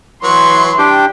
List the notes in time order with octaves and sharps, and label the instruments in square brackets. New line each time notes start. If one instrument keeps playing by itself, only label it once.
[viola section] E3 C6 [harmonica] F#3 B4 C#6
[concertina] D4 G4 G5